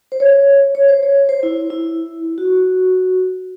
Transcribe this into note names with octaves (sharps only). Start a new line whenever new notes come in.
C5
C#5
C#5
C5
C#5
C5
E4
E4
F#4